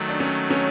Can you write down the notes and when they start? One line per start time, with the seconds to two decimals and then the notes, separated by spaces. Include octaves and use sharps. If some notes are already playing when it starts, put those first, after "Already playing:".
Already playing: D#3 F#3 A3
0.09 D4
0.20 C#4
0.50 C#4